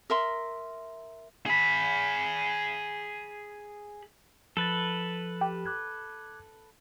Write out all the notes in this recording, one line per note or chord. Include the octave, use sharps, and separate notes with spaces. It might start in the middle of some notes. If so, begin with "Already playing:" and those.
A#4 E5 C6
G#4 B5
F3 A4 B4 A6
G4
D6 F#6 G#6